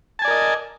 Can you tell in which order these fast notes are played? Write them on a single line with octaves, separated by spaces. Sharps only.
A5 G#5 D5 A#4 D#5